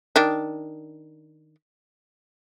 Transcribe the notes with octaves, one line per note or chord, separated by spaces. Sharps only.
D#3 D4